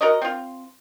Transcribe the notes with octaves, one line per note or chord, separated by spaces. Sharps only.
F#4 A#4 C#5 D#5
C4 F4